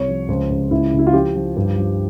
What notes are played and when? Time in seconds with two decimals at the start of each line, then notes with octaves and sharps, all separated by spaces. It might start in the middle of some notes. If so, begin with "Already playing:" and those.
Already playing: C2 C#5
0.08 F3
0.28 C#2 C5
0.50 C#2
0.71 C#2 E4
0.93 C#3
0.99 E4
1.07 F4
1.13 F3 G4
1.36 F3
1.56 G2
1.78 F3